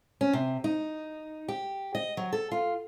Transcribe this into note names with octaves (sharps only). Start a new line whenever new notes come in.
C#4
C3
D#4
G4
D#5
F#3
A4
F4